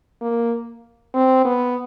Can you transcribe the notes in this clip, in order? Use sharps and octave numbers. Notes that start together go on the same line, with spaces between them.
A#3
C4
B3